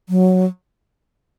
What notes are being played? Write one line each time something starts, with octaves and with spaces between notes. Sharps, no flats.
F#3